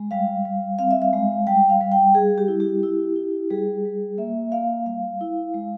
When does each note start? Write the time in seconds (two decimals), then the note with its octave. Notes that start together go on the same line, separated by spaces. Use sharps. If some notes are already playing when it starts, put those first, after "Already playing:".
Already playing: G#3
0.11 G3 F5
0.45 G3
0.79 C4 F5
0.91 E5
1.02 F5
1.13 G#3
1.47 G3 G5
1.69 F5
1.81 G3
1.92 G5
2.15 G3 G#4
2.38 G4
2.48 E4
2.60 G4
2.83 E4
3.16 E4
3.50 G3 G#4
3.85 G3
4.18 A#3 E5
4.52 A#3 F5
4.86 G3 F5
5.21 E4
5.54 G#3